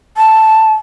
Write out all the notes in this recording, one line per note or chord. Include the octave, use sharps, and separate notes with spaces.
A5